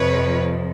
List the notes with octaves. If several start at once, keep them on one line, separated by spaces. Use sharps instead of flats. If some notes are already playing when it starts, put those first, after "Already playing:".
Already playing: F2 C3 F3 B4 C#5